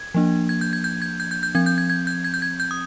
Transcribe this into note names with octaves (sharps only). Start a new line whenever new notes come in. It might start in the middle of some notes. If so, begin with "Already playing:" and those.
Already playing: G#6
F3 A#3 D4
G#6
G6
G#6
G6
G#6
G6
G6
G6
F3 C4 G#6
G6
G#6
G#6
G6
G#6
G6
G#6
G6
D#6